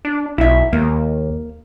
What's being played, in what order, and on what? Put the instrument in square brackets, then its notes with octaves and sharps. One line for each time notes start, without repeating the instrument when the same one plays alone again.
[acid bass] D4
[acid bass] B1 [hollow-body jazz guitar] E4 E5
[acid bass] D#2 [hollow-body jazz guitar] A#3